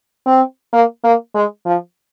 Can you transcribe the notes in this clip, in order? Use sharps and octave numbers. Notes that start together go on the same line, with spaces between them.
C4
A#3
A#3
G#3
F3